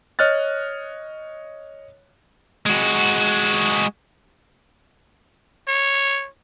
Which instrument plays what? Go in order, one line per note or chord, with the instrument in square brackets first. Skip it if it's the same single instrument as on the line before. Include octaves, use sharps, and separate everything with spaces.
[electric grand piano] C#5 D#5 F6 F#6 A6
[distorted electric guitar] G#3 F#4
[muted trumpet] C#5